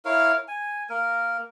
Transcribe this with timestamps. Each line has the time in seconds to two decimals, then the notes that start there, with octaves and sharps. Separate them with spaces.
0.05 E4 A#4 C#5 F5
0.48 G#5
0.90 A#3 A#4